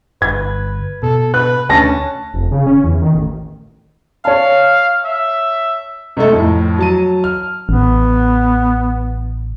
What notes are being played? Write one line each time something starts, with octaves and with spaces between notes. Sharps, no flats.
G1 B4 G#6
B2 A4
B4 F#6
D2 D3 C#4 A5 A#6
F1
C#3
C#4
E2
D#3
A1
C#5 F5 A5
E5
C3 G#3 A3 D#4 A4
F2 A2
F#3 A5 D#7
F6
A1 B3